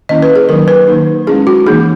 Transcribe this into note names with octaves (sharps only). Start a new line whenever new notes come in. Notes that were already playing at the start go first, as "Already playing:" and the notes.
D#3 A#3 C#4 E4 D#5
B4
G#4
D#3 F#3 A#3 D#4 A#4
B4
D#3 A#3 D#4
G#3 C#4 E4 G#4
F#4
E3 A#3 D#4 G#4